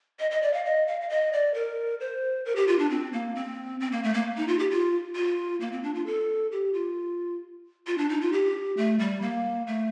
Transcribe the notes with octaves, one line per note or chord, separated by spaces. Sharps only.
D#5
D#5
D5
F5
D#5
F5
F5
D#5
D5
A#4
C5
A#4
G4
F4
D4
C4
A#3
C4
C4
A#3
A3
A#3
D#4
F4
G4
F4
F4
A#3
C4
D4
F4
A4
G4
F4
F4
D4
D#4
F4
G4
A3
G3
A#3
A3